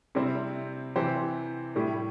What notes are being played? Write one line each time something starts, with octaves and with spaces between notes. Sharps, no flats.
C3 G3 C4 E4 C5
C3 E3 C4 G4 C5
A2 G3 E4 G4